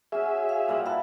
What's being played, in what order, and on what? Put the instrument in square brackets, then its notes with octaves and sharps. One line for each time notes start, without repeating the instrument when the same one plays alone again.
[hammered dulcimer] C#4 F#4 [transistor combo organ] G#4 E5
[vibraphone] F5
[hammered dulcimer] A#2 G3 F#5
[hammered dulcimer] E4 A4 B4 [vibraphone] F5